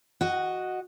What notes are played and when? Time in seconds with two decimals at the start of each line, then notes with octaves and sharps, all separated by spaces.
0.21 F#4 D#5